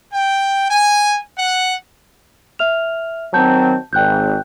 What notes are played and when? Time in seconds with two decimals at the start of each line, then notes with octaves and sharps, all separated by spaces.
0.13 G5
0.71 G#5
1.38 F#5
2.59 E5 F6 F7
3.34 D#3 F#3 C4 A5 G6
3.93 G#1 G5 F#6 G6